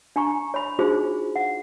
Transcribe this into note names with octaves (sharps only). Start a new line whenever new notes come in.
D4 G#5 A#5 C#6
C#5 B5
D4 D#4 F4 F#4 G#4 C5
F#5